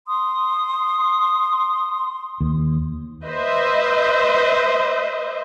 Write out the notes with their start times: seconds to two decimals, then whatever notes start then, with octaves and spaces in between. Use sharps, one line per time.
0.07 C6 D#6
2.41 D#2
3.25 B4 C5 D#5 E5